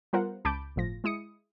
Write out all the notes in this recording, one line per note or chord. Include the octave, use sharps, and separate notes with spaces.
G3 B3 F4 A#4 C5 F#5
C#2 A5 B5 D6 G6 D7
G1 A2 F3 A#6
G#3 E4 D#6 C#7